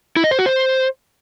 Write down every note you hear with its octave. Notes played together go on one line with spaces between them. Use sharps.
E4
D#5
C5
F#4
C5